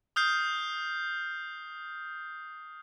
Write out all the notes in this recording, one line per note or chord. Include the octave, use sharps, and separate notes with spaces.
D#6 F6 G6 C7